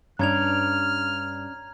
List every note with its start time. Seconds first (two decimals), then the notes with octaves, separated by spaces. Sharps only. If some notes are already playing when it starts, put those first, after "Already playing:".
0.19 G2 C#4 D4 A#5 F6 G#6 F7